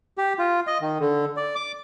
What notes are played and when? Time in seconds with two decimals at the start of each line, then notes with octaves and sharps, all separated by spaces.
0.18 G4
0.39 F4
0.67 D#5
0.81 D#3
1.00 D3
1.37 D5
1.56 D6